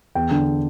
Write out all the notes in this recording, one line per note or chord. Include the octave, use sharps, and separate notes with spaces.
E2 G5
D3